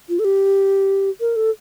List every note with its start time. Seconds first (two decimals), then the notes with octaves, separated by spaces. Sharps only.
0.09 F4
0.19 A4
0.25 G4
1.20 A#4
1.36 A4